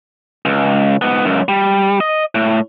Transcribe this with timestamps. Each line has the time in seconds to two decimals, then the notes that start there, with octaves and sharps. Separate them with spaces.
0.45 C#2
1.02 G#2 B3
1.25 C#2 F#2
1.49 G3
2.01 D#5
2.35 A2